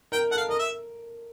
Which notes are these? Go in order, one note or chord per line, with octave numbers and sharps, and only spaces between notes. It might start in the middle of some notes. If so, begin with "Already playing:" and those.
A#4 G5
A4 F#5
F5
A#4 D#5
E5